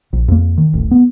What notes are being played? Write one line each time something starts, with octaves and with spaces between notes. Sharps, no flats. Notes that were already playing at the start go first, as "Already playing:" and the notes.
A#1
F2 A#3
D#3
D#1 A1
B3